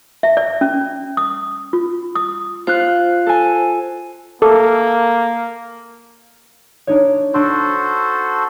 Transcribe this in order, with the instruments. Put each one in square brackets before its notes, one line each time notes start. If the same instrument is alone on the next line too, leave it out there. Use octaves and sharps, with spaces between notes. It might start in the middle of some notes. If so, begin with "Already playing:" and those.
[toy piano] E5
D5
C#4
D#6
F4
D#6
[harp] F4 F#6 [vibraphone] C5
[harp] A4 G#5
[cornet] A#3 [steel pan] A4
[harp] D4 D#4 C#5
[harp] D4 C6 [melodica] F#4 A4 C5